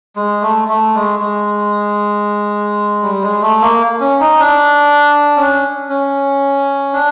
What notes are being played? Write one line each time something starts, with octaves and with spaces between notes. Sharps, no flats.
G#3
A3
A3
G#3
G#3
G3
G#3
A3
A#3
C#4
D#4
D4
C#4
C#4
D4